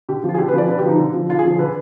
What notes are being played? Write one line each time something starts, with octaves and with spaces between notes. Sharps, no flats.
D3 G4
F3
F4
G#4
D3 G4
B4
F3 D5
D3 B4
G4
F3 D#4
D3
F3
D3 F4
G#4
F3
D3 B4